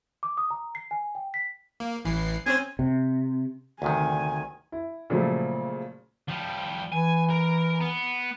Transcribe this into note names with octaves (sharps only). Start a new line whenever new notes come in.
D6
D#6
A#5
C7
G#5
G5
B6
A#3
A1 E3 C7
C4 C#4 C5 G#5
C3
D2 C3 D#3 G#5
E4
A#2 C#3 F3 F#3 A3
F3 G3
E3 G#5
A#4
B3